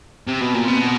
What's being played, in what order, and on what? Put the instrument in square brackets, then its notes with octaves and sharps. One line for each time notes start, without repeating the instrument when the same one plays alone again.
[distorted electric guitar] C3
B2
A#2
[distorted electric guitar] B2 [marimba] C4